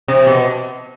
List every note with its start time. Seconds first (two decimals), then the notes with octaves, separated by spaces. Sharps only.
0.08 C3
0.27 B2